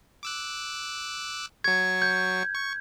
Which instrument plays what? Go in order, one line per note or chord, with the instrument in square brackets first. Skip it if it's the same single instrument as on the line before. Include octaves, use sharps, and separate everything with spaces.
[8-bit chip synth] D6 E6 F#6
[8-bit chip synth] F#3 C#6 [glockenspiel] G#6
[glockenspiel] G6
[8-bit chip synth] C#6